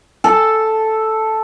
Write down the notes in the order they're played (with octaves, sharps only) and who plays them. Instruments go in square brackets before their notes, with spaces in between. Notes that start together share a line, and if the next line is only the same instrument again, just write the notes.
[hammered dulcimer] A4